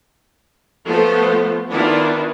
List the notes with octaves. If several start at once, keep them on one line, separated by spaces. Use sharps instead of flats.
F3 A3 B3 A4 C5
D#3 B3 D4 E4 F4